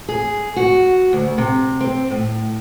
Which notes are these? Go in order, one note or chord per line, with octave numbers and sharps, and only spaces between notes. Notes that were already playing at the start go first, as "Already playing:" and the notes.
G#4
F#4
D2
C3
C4
A2